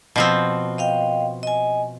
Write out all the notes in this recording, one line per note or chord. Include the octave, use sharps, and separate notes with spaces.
B2 F3 C4
D#5 F5 G5
D#5 G#5